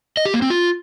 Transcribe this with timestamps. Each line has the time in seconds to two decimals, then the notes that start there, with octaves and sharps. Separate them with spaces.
0.17 D#5
0.26 G4
0.34 A#3
0.42 C4
0.50 F4